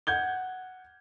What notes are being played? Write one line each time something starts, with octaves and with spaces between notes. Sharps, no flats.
F#5 G6 G#6 G7